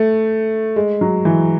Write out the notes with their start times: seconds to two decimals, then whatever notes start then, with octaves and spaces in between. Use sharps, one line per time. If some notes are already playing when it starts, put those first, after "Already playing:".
Already playing: A3
0.76 G#3
1.01 F#3
1.25 E3